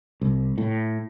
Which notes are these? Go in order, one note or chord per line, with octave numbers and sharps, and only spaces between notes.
C2
A2